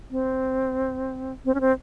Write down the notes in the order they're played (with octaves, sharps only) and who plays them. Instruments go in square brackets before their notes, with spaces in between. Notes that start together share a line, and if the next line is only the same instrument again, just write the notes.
[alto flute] C4
C4
C#4
C4